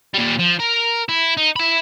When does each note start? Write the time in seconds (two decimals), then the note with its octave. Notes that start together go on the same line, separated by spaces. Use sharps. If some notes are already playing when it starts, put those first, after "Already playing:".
0.14 A#2 G3
0.39 F3
0.60 A#4
1.09 E4
1.37 D#4
1.56 E5 B5